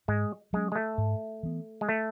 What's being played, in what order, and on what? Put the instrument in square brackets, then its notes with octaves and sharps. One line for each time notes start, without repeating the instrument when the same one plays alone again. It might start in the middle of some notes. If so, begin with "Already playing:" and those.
[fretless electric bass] G#2 [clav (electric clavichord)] G#3
[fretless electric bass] F#3 C#4 [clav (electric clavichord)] G#3
[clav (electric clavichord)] G#3
A3
[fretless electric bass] G#2
E3 B3
[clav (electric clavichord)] G#3
A3